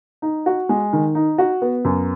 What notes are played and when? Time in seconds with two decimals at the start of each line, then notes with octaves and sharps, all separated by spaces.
0.22 D#4
0.46 F#4
0.69 G#3
0.93 D#3
1.15 D#4
1.38 F#4
1.62 B3
1.85 F#2